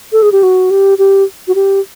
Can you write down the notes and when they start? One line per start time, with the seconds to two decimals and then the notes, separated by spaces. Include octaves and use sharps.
0.12 A4
0.22 G#4
0.32 G4
0.43 F#4
0.71 G4
0.98 G4
1.48 F#4
1.55 G4